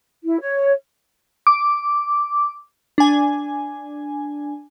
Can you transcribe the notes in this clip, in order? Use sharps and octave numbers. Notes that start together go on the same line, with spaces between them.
E4
C#5
D6
D4 G#5